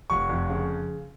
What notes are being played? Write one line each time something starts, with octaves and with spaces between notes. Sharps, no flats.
F1 C#6
F2
C#3